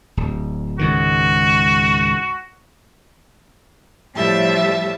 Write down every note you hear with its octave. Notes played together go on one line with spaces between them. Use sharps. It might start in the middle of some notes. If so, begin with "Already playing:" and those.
D1
C#2 G#2 D#3 F#4
A2 F3 G3 E5 A5